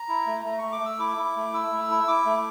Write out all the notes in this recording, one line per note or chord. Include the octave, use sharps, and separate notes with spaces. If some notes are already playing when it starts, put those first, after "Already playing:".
Already playing: A#5
E4
A3
A3 A#5
A3 C#6
D6
A3 E6
E4 D6
E4
A3
E4 E6
A3
E4
E4 D6
A3